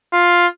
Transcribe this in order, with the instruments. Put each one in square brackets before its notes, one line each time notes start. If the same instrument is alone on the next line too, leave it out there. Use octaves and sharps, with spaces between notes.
[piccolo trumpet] F4